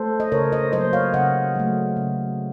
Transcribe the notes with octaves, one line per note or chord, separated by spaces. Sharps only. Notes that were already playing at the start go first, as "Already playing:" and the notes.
Already playing: A3 A4 C5
D#5
C#3 A#4 C#5
C5 D#5
F#3 A#3 C5 D#5
C#5 F5
C#3 D#5 F#5
F#3 A3
C#3